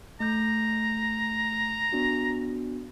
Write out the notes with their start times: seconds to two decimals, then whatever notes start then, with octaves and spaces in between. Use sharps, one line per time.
0.20 A3 A#5 G6
1.92 B3 D4 F#4